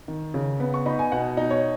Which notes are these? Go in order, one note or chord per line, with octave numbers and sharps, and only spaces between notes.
D#3
C#3
B3
C#6
D#4 B5
G#5
B2 F#5
D#4
C#5